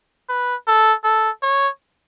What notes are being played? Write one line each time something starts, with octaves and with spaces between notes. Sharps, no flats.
B4
A4
A4
C#5